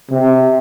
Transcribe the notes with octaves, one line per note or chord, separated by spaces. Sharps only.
C3